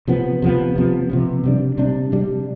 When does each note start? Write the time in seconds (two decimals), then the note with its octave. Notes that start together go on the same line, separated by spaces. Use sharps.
0.08 C3 F3 B3
0.42 C3 F3 B3
0.76 C3 F3 B3
1.10 C3 F3 B3
1.44 C3 G3 D4
1.78 C3 G3 D4
2.12 C3 G3 D4